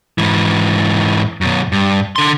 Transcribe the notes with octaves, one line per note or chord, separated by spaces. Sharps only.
G#2 E3
F#2 B2
G2
D3 C6